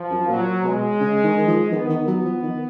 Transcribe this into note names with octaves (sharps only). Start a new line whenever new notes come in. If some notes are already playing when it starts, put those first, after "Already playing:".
Already playing: F3
F#2
A#2 F#3
B2 G#3
C#3
D#3
D#3
F3
D#3 B3
D#3
F#3
F3
D#3